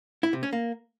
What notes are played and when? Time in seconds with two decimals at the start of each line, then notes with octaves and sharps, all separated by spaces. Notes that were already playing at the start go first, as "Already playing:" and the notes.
0.23 E4
0.33 C3
0.43 C#4
0.53 A#3